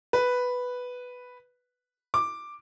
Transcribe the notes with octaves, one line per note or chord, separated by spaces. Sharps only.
B4
D6